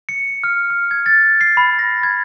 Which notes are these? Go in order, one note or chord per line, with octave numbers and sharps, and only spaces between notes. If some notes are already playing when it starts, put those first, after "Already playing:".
C#7
F6
F6
G#6
A6
C7
B5
A#6
G#6